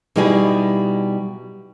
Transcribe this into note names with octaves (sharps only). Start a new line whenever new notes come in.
B2 G3 D#4 E4 G#4